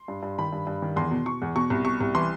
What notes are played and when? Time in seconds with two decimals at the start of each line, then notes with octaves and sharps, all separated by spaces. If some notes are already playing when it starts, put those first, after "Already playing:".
Already playing: C6
0.08 G2
0.23 G2
0.38 D#3 B5
0.52 G2
0.67 G2
0.82 D#3
0.96 E2 C6
1.11 B2
1.26 B2 C#6
1.42 E2
1.56 B2 C#6
1.70 C2
1.85 B2 C#6
2.01 C2
2.15 E3 C6